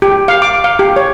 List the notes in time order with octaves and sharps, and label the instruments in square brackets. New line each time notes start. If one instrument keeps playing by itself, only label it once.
[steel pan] G4
F5
D6
F5
G4
C#5